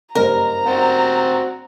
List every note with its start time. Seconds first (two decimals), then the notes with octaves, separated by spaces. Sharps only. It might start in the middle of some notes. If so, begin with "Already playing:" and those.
0.15 F#1 G2 A#4 C5 A#5
0.66 C4 F#4